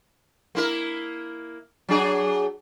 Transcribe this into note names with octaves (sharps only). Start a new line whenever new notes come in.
A#3 E4 A#4
F#3 D4 G#4